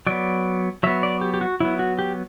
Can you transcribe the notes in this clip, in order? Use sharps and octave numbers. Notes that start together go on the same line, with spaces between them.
F#3 B3 D5
F#3 B3 E5
D5
G4
G4
F#4
F#3 B3 E4
F#4
G4